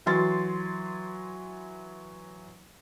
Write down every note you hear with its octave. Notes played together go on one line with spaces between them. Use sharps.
E3 F#3 C6 A6